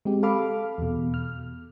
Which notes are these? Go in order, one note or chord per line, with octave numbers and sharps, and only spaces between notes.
G#3 C4 G4
A4 F5 B5 D6 F6
E2 B2
F6